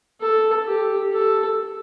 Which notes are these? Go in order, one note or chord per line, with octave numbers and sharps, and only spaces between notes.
A4
G4
A4